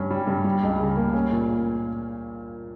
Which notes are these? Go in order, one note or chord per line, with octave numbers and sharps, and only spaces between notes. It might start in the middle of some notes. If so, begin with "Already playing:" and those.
Already playing: G2 C#4
G3
G2
G3
C#2
C#3
A#3
C#4
A#2
A#3